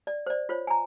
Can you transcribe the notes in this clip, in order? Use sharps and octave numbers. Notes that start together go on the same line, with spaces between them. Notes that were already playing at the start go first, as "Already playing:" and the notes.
D5
C5 D5
F4 C5 C#5
G#5 A#5